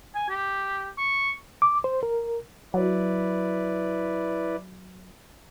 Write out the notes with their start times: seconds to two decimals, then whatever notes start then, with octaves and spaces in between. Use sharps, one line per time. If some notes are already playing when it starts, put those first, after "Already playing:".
0.15 G#5
0.29 G4
0.98 C#6
1.62 D6
1.84 C5
2.03 A#4
2.74 F#3 E4 B4 D5